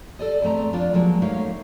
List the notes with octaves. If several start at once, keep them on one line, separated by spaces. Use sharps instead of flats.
A4 D5 D#5
E2 E3 A3 C4 A#5
F2 D4 F4 D5
F3 F#3 G#3 A#3
A3 A#3 C#4 D#4 C#5 F5